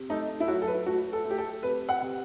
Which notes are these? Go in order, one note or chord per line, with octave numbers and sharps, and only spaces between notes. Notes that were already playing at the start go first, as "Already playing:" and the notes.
Already playing: C3
A3 D#4
E4
F#3 F#4
A4
B4
A3 F#4
A4
A3
G4
A4
C3 B4
F#5
C3